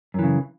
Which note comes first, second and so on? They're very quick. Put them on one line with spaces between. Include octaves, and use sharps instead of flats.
F#2 E3 C#3